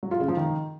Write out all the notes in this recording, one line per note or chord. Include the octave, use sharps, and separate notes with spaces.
F#3
F4
C#3
F3
D#3